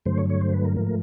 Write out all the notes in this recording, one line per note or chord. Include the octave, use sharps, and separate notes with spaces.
G2 D3 F#3 A3 C5
C#5
C#5
C5
B4
A#4
G#2 F3 A3 A#4